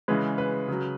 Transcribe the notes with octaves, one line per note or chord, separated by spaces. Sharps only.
C#3 E3 G#3 B4
B4
C#3 F#3